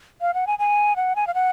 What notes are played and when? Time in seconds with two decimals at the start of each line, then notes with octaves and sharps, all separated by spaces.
0.21 F5
0.34 F#5
0.47 G#5
0.59 G#5
0.96 F#5
1.16 G#5
1.27 F5
1.34 F#5